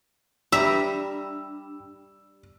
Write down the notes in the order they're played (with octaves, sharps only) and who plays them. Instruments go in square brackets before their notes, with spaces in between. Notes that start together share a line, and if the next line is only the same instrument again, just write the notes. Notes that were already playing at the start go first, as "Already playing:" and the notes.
[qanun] G3 A#5 [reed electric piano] D4 G5 B5 [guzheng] E5 [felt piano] E6